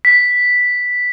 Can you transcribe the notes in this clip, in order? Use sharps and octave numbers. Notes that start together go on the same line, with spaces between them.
B6